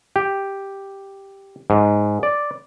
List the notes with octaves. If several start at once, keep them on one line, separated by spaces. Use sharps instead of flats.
G4
G#2
D5